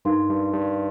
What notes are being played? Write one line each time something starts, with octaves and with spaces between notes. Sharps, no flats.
G2 D#4 A#4 F5 C6
G2
G2